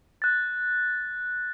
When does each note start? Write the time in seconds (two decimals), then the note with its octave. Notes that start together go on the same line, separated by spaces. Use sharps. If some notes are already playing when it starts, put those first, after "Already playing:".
0.22 F#6 A6